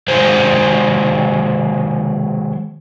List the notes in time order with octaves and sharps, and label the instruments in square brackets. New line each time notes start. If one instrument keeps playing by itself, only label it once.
[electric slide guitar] D#3 F#3 G#3 G#4 C5